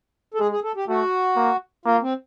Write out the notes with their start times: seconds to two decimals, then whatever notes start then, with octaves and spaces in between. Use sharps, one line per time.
0.34 A4
0.39 G#3 G#4
0.51 G#4
0.64 A4
0.76 G4
0.88 A3 F#4
1.36 A#3
1.86 A#3 F4
2.02 C4